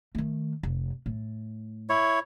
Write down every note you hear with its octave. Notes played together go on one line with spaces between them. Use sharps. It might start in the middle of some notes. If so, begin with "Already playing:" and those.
D#3 A3
F1
A2
E4 C#5